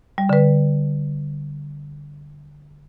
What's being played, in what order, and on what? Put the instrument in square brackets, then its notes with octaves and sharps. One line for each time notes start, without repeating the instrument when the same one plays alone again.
[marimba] G3
D3 B4